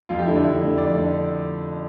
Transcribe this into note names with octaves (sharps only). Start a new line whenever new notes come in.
F2 F4
G4
D3 A3 E4
D4
F2 E4
D3 A3
F2 D5
D3 A3